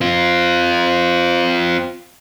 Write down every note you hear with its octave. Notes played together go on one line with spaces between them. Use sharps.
C4 F4